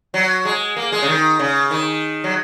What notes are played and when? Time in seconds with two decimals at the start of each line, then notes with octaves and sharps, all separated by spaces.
0.14 F#3
0.45 G#3
0.76 A#3
0.92 G#3
1.02 C#3
1.08 D#3
1.39 C#3
1.71 D#3
2.24 F#3